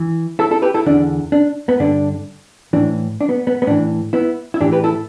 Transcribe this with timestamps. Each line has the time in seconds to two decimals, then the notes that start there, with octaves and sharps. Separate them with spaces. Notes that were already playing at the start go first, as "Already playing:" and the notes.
Already playing: E3
0.39 E4 A4
0.51 E4 A4
0.62 G4 B4
0.74 E4 A4
0.86 E2 D3 D4
1.32 D4
1.69 B3
1.80 G2 D3 D4
2.73 A2 E3 D4
3.21 D4
3.29 B3
3.47 B3
3.62 B3
3.67 A2 E3 D4
4.13 B3 E4
4.54 E4
4.61 A2 E3 D4 G4
4.72 G4 B4
4.84 E4 A4